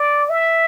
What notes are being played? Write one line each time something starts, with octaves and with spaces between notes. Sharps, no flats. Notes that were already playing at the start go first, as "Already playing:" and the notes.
Already playing: D5
E5